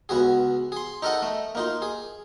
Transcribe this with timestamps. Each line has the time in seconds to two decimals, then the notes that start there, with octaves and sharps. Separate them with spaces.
0.09 C#2 B3 F#4 G#4
0.72 G#4 C6
1.02 D#4 A4 A#4 D#5 F#5
1.22 A3
1.55 A#3 D#4 F4
1.82 G#4